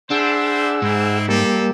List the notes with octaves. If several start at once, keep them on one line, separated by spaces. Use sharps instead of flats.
D4 E4 G#4 C5 F#5 E6
G#2 C4 E4
G3 A#3 C4 G4 A4